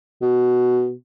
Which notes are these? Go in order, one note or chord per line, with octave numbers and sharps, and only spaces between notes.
B2